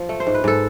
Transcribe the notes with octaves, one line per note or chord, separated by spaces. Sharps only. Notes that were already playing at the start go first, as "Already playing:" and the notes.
Already playing: F3
A3
C5
G#2
B4
G#2 A4